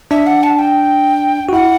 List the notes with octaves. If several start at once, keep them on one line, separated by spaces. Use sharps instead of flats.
D4 E5
F#5
A5
G5
F#4
E4 F#5